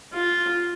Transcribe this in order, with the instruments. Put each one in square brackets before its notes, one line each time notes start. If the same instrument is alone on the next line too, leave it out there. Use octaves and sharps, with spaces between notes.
[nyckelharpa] F4